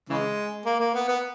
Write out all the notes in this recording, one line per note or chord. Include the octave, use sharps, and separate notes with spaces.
C#3 E3 G#3
A#3
A#3
B3
B3